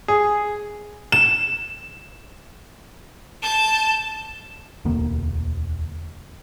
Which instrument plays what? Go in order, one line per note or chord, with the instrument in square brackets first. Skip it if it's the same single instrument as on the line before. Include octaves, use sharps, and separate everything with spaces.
[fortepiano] G#4
[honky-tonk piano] E7
[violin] A5 G6
[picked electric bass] E1 D2 D3 A#3